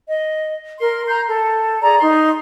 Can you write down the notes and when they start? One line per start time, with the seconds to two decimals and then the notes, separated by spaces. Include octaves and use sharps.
0.08 D#5
0.79 A#4 C6
1.08 A#5 C6 G6
1.28 A4
1.82 G#4 D5 A#5
2.01 D#4 C6